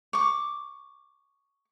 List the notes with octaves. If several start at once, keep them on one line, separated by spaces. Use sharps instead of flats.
C#6 D6